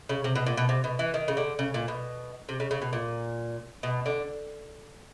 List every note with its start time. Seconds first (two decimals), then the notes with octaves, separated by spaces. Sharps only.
0.09 C#3
0.24 C3
0.35 B2
0.46 A#2
0.57 B2
0.69 C3
0.84 B2
0.99 E3
1.14 D#3
1.28 C#3
1.37 D3
1.59 C#3
1.74 A#2
1.88 B2
2.49 C3
2.60 C#3
2.71 C#3
2.82 B2
2.93 A#2
3.83 B2
4.06 D3